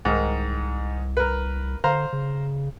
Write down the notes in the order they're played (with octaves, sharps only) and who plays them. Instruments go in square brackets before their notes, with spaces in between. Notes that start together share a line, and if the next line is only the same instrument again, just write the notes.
[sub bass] C2 [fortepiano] G#2 D#3
[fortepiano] A#4 B4
[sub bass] D3 [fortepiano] C5 F5 A#5
[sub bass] C#3